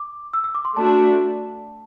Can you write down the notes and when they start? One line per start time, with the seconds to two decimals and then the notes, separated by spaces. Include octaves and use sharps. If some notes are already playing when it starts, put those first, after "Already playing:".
Already playing: D6
0.34 E6
0.44 E6
0.55 D6
0.65 C6
0.77 A3 D4 F#4 A5